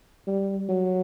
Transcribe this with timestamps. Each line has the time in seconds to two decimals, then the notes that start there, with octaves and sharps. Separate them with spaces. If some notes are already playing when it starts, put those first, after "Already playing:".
0.27 G3
0.69 F#3